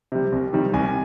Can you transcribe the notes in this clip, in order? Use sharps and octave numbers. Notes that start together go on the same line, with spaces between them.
C3 G3
C2
C3 D#3 G3
C2 G#5